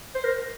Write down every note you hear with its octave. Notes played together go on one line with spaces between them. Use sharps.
C5
A#4